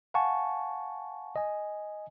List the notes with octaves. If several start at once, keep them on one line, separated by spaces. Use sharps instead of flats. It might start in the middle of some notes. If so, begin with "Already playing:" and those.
F5 F#5 G#5 A5 C#6
D#5 G#5